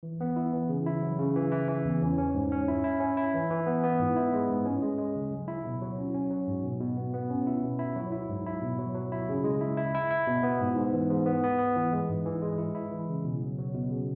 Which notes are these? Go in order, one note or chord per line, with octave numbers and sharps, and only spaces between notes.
E3
B3
E4
E3
C#3
E4
F#3
C#3
E3
E3
E3
E2
C#4
C#4
G#2
C#4
E4
E4
C#4
E4
E3
E3
B3
B3
G#2
E4
G#3
G#2
C#4
G#3
G#3
C#3
F#3
E4
B2
F#3
C#4
C#4
F#3
G#2
B2
B2
B3
B3
C#4
E4
B2
E4
F#3
E4
G#2
E4
B2
F#3
F#3
E4
C#3
G#3
E4
E4
E4
E4
B2
B3
G#2
G#2
E3
G#2
B3
B3
B3
E3
G#3
G#2
E3
G#3
E4
E4
E3
C#3
B2
F#3
F#3
B2
C#3